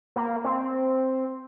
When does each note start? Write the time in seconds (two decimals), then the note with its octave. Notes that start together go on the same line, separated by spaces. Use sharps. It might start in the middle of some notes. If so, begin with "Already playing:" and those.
0.16 A#3
0.44 C4